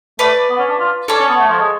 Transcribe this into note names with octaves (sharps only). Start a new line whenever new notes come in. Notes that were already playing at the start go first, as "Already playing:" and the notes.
A3 B4 D5
B3
C#4
D4
F4
D4 A4 C#5
C#4
B3
A3
F3
G#3